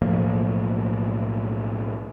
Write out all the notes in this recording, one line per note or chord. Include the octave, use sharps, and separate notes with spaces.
B1 A2 F3 A#3